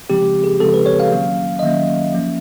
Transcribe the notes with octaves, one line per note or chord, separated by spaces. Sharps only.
C#3 F3 G#3 C4 G4
G#4
C#3 F3 G#3 C4 A4
B4
C#5
F5
D#3 F#3 A#3 C#4
D#5
D#3 F#3 A#3 C#4 E5
F3 A#3 C#4